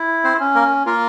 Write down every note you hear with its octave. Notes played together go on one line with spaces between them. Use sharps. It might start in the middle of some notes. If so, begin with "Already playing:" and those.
Already playing: E4
C4 C5
C#4
A#3 A#4
A#3 F4 A#4